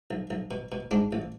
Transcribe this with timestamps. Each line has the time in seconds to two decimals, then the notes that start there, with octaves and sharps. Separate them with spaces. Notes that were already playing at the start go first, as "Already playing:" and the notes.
0.11 B1
0.31 B1
0.51 B2
0.72 B2
0.91 G#2 D4
1.13 A1